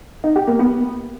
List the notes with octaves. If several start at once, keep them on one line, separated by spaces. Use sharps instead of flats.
D#4
G4
A#3
B3